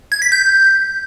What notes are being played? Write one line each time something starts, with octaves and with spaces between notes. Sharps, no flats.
G#6
B6
G6